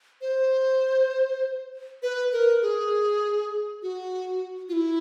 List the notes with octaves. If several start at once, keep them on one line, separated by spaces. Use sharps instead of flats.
C5
B4
A#4
G#4
F#4
F4
E4